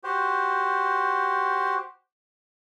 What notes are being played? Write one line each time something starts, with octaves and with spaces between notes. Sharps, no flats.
F#4 G4 C5